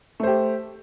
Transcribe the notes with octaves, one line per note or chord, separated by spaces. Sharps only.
A3 G4 C5